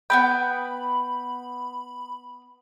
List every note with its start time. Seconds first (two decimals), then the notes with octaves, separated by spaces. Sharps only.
0.10 B3 C4 G5 B5